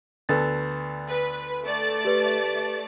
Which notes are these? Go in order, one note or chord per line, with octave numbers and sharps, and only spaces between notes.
D2 B3 A4 A6
B4
A3 D5 A6
G4 B4